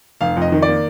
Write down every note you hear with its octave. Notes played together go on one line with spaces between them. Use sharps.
F1 F5
F2
D#5
D#3
D5
A#3